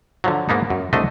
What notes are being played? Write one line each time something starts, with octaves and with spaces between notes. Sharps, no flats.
D3 F3 F#3
G#2 A#3 B3 D#4
F#2
C2 A3 D4 C5 D#5